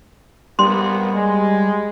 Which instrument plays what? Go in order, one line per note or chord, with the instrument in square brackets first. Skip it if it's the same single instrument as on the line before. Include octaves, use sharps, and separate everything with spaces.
[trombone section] A#1 A#3 B3 [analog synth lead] G3 [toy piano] C6
[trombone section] G#3